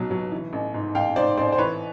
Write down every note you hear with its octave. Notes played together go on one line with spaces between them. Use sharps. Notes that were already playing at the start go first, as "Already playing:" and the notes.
Already playing: B1 B2 F#3
F#3
E3
A1
G#2
A1 F5 G5
G#2 C5 D5
A1 C5 D5
C5
E3 B4 C#5